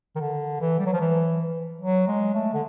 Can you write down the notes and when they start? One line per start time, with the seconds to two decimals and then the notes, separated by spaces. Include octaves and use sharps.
0.16 D#3
0.20 D3
0.61 E3
0.79 G3
0.86 F#3
0.93 F3
1.00 E3
1.81 F#3
2.08 G#3
2.34 A3
2.53 D3